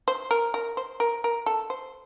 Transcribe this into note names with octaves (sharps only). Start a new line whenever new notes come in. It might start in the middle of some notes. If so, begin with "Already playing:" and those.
C5
A#4
A#4
C5
A#4
A#4
A4
C5